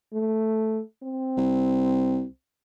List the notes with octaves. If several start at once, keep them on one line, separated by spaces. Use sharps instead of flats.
A3
C4
C2